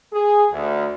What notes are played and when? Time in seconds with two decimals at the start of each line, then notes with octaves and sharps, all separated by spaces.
0.11 G#4
0.51 D2